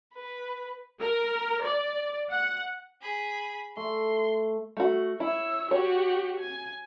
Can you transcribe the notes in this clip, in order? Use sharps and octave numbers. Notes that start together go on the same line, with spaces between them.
B4
A#4
D5
F#5
G#4 B5
A3 C6
A3 F#4
E4 C#5 E6
F#4 G4 C#5
G#5